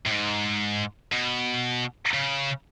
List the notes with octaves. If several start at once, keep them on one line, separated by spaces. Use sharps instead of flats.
A2
G#2
B2
C#3